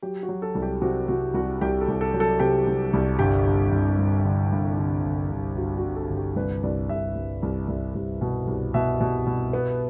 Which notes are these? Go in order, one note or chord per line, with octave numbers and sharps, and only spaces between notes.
F#3 G4
F#4
F#3
A4
C2
G4
C3 F#4
C3 F#4
C2 F#4
C2 G4
A4
C2
A4
F#3
A4
C3 G4
C3
C2
G1 G4
G1
G1
G2
D3
G2
D3
G1
G1
G1 F#4
F#4
G2
A4
G1
G4
C2 B4
C2 D5
C2 E5
C2
C2
C2
C2
B2
C2
B2 E5
B2
B2
B3